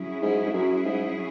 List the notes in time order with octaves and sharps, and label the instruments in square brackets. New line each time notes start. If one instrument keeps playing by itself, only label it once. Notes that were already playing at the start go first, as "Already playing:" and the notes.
Already playing: [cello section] F#3 C#4 E4 G#4
[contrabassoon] G#2
G#2
F#2
G#2